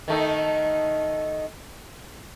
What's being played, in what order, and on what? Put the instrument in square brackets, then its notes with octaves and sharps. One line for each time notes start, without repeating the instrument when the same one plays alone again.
[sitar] D#3 A3 D#4